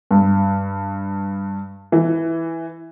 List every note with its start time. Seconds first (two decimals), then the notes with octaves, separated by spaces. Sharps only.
0.11 G2
1.92 E3